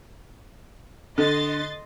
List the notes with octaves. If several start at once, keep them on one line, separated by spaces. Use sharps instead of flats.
D3 A4 D#5 C6 A6